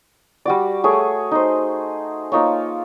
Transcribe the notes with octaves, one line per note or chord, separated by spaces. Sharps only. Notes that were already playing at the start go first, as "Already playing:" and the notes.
G3 F#4 D5
A3 G#4 C#5
D#4 C5
A#3 D#4 F4 C#5